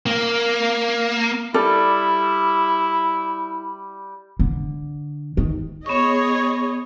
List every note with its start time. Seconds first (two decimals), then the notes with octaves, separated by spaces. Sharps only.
0.06 A#3
1.54 G3 E4 A4
4.39 D3
5.37 D#3
5.86 B3 G#4 C#5 D#5 C#6